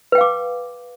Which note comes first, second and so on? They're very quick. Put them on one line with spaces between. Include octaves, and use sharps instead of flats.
B4 G5 F5 D6